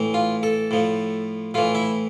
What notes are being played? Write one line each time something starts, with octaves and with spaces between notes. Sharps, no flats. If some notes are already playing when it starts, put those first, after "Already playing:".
Already playing: A2 E3
F4
A4
A2 F3
A2 E3 F4
E4